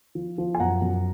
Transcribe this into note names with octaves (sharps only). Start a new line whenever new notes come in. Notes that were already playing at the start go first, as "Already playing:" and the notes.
F3
F3
G#5
F#2 F#5 A#5
F#2